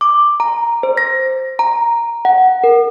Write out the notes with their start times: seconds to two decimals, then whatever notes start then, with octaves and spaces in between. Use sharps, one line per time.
0.01 D6
0.40 A#5
0.83 C5
0.97 A#6
1.59 A#5
2.25 F#5
2.64 A#4